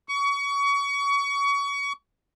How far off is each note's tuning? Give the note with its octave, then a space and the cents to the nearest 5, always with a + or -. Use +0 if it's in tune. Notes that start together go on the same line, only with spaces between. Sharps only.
C#6 +30